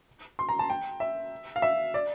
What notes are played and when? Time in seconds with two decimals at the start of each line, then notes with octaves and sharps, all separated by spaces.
0.39 C6
0.49 A#5
0.59 A5
0.70 G5
1.00 E5
1.56 F5
1.62 E5
1.94 D5